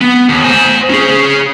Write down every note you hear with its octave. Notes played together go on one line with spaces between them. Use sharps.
B3
D#2
C5 G#5
C#4 G#4